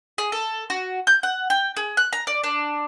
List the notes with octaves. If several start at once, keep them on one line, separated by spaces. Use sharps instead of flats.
G#4
A4
F#4
G6
F#5
G5
G#4
F#6
A#5
D5
D4